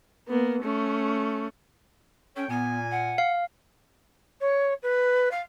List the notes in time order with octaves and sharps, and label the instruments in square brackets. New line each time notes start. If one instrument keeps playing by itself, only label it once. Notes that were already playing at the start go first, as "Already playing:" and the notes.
[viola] A#3 B3
A3 C#4
[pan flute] C#4 [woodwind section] A4 C#5 G5
[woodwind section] A#2 G#5 [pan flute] B3
[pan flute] F#5
[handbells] F5
[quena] C#5
B4
F5